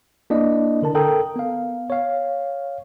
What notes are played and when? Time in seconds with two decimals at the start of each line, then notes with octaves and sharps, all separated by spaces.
0.30 A#3 D4 E4 D5 D#5
0.82 D3 A#4 A5
0.95 A4 A#4 G5 A#5 D#6
1.36 B3 F5
1.90 C#5 F5